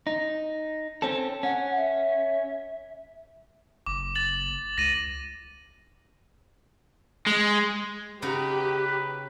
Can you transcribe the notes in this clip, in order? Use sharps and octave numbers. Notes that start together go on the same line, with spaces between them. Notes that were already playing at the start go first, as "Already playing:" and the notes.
D#4
C4 C#4 A4
C#4 F#5
E5
F#1 D6
A6 F#7
C#2 A#6 D#7
G#3
C#3 D#4 F#4 G4 B4